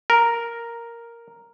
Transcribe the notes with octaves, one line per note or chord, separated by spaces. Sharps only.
A#4